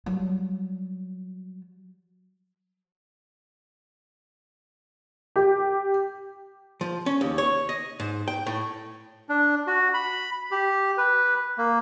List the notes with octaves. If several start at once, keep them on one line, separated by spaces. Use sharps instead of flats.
F#3 G3
G4
F3
C#4
D#2
C#5
D#5
G#2
G5
A2
D4
F#4
B5
G4
B4
A#3